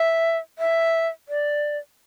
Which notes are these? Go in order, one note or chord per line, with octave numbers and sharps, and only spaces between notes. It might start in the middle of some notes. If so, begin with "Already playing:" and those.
Already playing: E5
E5
D5